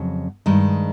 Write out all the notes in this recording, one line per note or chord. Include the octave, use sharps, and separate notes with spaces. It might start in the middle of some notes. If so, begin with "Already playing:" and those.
Already playing: F2 C#3 F#3
G2 D#3 G#3